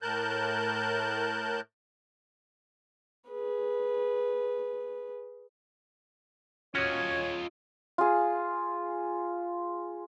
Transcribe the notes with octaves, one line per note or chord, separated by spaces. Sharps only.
A2 A#4 A5 F#6 G6
G#4 B4
C#4 F4 F#4 C#5 D#5 G#5
F4 G#4